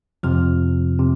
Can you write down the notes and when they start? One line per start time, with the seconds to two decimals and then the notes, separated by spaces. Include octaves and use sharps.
0.23 F2 C3 F3 F6
0.99 C3